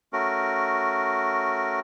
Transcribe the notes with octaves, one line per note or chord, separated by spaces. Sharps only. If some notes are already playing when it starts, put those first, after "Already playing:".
A3 C#4 F#4 A#4